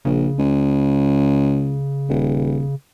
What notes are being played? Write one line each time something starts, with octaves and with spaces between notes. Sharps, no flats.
A#1 C#3
C#2
D#1